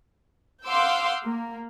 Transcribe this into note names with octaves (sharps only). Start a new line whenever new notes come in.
F5 F#5 C6 D6 E6 G6
A#3